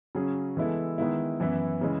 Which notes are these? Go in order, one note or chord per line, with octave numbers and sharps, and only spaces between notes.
C#3 F#3 C#4 G#4
E3 G#3 B3 E4 A4
D#3 G#3 B3 E4
F#2 E3 B3 E4
C#3 E3 G#3